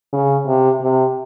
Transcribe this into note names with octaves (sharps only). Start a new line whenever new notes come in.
C#3
C3
C3